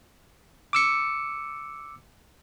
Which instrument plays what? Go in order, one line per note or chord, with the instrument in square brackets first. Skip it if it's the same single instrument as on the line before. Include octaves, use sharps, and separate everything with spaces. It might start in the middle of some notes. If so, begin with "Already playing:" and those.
[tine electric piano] D6 E6 C#7